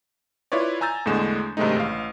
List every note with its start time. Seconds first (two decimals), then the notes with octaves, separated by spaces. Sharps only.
0.52 E4 F4 B4 C#5 D5
0.81 G#5 A#5 E6 G6 A6
1.05 E2 A2 D3 G#3 E7
1.57 G2 C3 D#3 G#3 A3 D#4
1.76 A1 F5